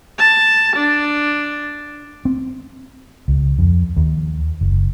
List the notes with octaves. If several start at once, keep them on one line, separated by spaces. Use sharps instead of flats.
A5
D4
C4
C#2
F2
D#2
F#1